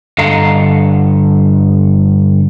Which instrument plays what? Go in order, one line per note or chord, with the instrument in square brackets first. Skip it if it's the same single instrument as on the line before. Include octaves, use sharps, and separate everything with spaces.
[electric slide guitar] G2 D3 A4 D#5 F5 A#5